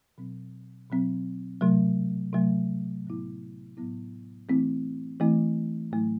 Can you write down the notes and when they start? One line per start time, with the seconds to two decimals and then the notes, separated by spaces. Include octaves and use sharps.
0.18 B2 F#3 C4
0.90 B2 F#3 C4
1.61 C3 F#3 A3
2.33 C3 F#3 A3
3.05 A2 F#3 B3 E4
3.77 A2 F#3 B3 E4
4.49 E3 A3 C4 E4
5.20 E3 A3 C4 E4
5.91 A2 F#3 A3 E4